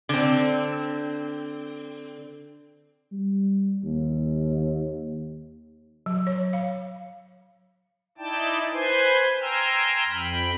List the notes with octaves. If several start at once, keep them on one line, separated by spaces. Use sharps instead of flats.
D3 C4
G3
D#2
F#3
C#5
F5
D#4 E4 D5 G5 A5
B4 C5 G#5 C6
G5 G#5 A#5 C6 E6 F6
F2 G5 B5